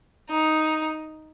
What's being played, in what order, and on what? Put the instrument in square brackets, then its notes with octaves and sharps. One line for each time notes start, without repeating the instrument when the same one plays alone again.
[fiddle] D#4